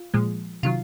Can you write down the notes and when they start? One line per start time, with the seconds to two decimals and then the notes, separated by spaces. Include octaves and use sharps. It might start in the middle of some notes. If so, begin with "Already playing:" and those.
Already playing: F4
0.14 A#2 F3 G#3
0.63 C3 D#3 F#3 F4